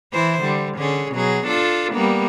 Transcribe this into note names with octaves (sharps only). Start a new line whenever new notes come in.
E3 E4 C5
D3 G3
D3 C#4 G#4
B2 F#3 G#4
D4 F4 A4
G3 A#3 B3